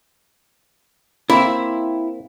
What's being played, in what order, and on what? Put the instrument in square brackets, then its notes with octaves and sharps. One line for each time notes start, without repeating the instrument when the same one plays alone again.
[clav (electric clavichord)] A#3 C4 [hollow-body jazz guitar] E4